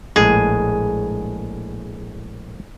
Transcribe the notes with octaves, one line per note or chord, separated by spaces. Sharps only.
A#1 A2 G#3 G#4